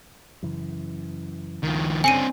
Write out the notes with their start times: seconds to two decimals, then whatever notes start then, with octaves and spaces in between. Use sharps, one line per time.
0.43 F#2 C#3 E3
1.63 F#1 C#2 D#3 F3
2.04 G1 C#3 C4 D4 G#5 C#7 D#7